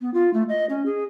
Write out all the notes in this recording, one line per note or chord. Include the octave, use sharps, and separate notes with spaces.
B3
F4
A3
D#5
C#4
G#4